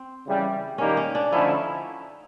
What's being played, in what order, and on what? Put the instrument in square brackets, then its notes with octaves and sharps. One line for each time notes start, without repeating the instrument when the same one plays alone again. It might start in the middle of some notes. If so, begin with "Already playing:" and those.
Already playing: [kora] C4
[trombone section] C#3 E3 G3
[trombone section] D#3 G3 A#3 D#4 G4 [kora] C#4
[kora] C#4
D4
[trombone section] D3 F3 A3 C#4 E4 [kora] D#4